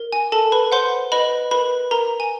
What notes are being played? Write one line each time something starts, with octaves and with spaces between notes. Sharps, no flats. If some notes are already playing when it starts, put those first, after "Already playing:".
Already playing: A#4
G#5
A4 A#4 A5
B4 B5
C5 F#5 C6
B4 D#5 B5
A#4 B4 B5
A#4 A#5
G#5